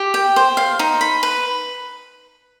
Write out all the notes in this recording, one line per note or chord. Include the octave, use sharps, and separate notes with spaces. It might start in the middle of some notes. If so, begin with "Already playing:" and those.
Already playing: G4
G5
C5
F5
D#4
B5
B4